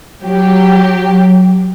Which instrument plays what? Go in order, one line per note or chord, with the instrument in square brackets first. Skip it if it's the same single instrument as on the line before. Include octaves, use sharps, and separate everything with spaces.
[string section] F#3 G4